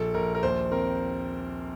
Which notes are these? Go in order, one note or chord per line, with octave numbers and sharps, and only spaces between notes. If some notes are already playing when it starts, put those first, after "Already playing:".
Already playing: A#1 A4
A#1 A#4
A#4
D#2 C5
C4 A#4